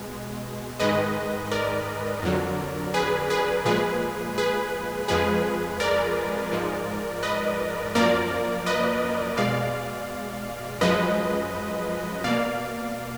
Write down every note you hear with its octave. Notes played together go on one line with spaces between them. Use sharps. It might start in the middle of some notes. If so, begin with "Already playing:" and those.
Already playing: B2 G#3
G#2 D#3 G#3 B4 D#5
A#4 D5
F2 D3 F#3
G#4 B4
G#4 B4
A#2 F3 G#3 G#4 B4
G#4 B4
F2 F3 G#3 G#4 B4
A#4 D5
G#2 F3 G#3
B4 D#5
F#2 F3 A#3 A#4 D5
B4 D#5
B2 G#3 D5 F5
F#2 F3 G#3 B4 D#5
B2 A#3 D5 F5